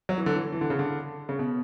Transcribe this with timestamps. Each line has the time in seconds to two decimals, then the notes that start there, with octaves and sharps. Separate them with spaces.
0.09 F#3
0.18 E3
0.26 D3
0.35 E3
0.52 E3
0.61 D3
0.70 C#3
0.79 D3
1.29 C#3
1.39 B2